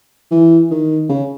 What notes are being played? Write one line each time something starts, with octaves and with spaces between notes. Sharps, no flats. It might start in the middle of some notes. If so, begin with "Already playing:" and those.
E3
D#3
C#3